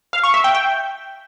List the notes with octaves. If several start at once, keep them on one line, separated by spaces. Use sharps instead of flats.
F5
C#6
E5
G5
G5